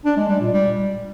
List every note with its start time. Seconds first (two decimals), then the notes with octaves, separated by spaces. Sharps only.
0.05 D4
0.17 G#3
0.29 G3
0.41 A#2
0.52 G3